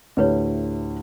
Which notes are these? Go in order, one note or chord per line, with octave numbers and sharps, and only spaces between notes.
D2 A2 E4 G4 B4 C#5